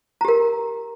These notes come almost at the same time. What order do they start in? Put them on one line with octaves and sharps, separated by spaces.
A#5 G4 A#4